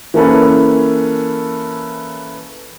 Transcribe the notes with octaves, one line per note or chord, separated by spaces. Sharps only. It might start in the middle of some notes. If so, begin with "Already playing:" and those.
E3 A#3 C#4 A4 B4